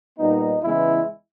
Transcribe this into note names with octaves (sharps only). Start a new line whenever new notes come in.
A#2 G3 B3 D#4
E2 C#3 G#3 B3 E4